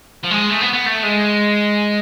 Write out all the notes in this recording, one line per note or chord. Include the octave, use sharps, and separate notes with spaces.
F3
G#3
A3
B3
B3
A3
G#3